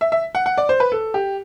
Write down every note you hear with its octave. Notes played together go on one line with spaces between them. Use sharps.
E5
E5
F#5
F#5
D5
C5
B4
A4
G4